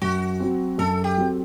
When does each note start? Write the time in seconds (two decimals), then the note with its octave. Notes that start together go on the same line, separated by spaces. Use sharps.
0.02 F#2 F#4
0.40 F#3 C4
0.78 F#2 A4
1.04 G4
1.18 F#3 C4